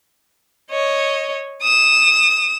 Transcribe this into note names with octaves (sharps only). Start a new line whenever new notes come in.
C#5 D#5
D#6 E7